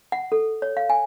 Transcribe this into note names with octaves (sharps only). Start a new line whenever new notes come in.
F#5
A4
C#5
F5
G#5